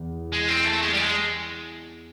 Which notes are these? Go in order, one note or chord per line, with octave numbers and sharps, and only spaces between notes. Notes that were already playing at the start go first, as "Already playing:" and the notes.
Already playing: E2 E3
G#3
C4
A3
G#3
G3
G#3